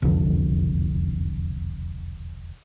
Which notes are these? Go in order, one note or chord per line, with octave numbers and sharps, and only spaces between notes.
E1 C2 F2 D3